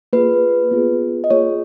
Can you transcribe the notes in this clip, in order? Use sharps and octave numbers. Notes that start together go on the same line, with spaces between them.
A#3 F4 G#4 B4
B3 F4 G#4
D#5
A#3 F4 G#4 C#5